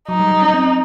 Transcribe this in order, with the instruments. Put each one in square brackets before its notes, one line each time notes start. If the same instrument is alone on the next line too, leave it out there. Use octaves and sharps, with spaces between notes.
[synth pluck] F#3 [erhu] D#4
[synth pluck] G3
G3
C#4
C4